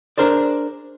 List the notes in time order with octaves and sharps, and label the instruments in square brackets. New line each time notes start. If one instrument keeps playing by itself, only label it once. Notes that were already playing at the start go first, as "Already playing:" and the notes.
[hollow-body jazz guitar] D4 G#4 A#4 C5 D5